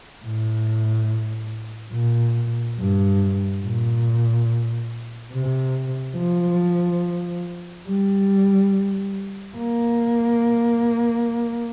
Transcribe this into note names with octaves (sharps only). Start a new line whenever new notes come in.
A2
A#2
G2
A#2
C3
F3
G3
A#3